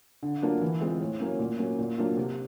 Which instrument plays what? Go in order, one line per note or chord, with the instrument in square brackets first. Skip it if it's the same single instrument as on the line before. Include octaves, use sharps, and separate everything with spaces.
[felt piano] D3
F#3 A#3 D4 F4
E3
G#3 C4 F4
A2
F#3 A#3 C#4
A#2
F#3 A#3 C#4
A#2
F#3 A#3 D4 F4
C3